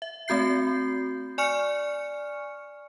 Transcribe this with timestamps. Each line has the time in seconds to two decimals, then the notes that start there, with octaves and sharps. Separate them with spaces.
0.02 E5
0.28 A3 C4 F#4 G6 C7
1.38 D5 G#5 C#6 F6 C#7